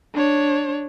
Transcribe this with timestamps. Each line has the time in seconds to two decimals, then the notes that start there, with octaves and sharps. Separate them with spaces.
0.14 D4 C#5